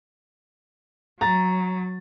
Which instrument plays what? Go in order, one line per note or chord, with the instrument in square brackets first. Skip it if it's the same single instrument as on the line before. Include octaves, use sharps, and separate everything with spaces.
[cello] F#3 [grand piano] A#5 A6